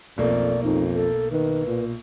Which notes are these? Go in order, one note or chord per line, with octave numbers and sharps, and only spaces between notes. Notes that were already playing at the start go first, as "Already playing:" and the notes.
B1 F2 A3 A#3 D5
F2 D#4
A4
D#3 B4
A#2